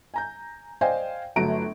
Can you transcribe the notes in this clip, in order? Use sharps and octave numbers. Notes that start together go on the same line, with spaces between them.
G#5 A#5 G6
C5 D5 D#5 F5 G5 G#5
G1 F#3 A3 A#5 D7